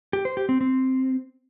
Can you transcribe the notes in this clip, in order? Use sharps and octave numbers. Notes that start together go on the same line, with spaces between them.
G4
C5
G4
C4
C4